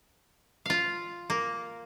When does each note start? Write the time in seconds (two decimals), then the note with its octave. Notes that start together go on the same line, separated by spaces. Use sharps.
0.66 F4 F5
1.30 A#3